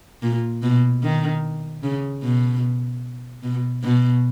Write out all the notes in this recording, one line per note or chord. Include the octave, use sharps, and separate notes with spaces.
A#2
B2
D#3
C#3
B2
B2
B2